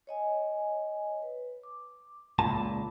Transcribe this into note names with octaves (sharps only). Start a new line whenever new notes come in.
C#5 D#5 G#5
B4
D6
C#2 A#2 A5 B5